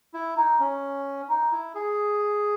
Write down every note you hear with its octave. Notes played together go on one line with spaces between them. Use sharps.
E4
D#4
C#4
D#4
E4
G#4